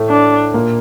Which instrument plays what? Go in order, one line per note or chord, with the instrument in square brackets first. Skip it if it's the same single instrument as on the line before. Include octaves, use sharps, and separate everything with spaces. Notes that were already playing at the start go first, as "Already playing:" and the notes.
Already playing: [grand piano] A2 A3
[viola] D4
[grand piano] A#2 A#3